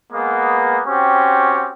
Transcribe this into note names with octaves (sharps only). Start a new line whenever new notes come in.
G#3 A#3 B3
C4 C#4 F#4 G4